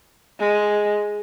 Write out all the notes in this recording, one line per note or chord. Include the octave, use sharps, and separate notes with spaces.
G#3